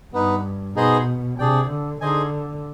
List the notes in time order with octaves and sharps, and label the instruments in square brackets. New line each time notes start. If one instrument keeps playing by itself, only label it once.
[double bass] G2 [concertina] B3 D#4 B4
[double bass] B2 [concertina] B3 D#4 G#4 C5 D#5
[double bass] C3 [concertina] D4 G#4 D5 G5
[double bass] D3
[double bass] D3 [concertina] D#4 G#4 C5 D#5 G#5